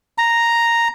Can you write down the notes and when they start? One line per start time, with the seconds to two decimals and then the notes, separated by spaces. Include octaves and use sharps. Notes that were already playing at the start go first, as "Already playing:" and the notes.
0.18 A#5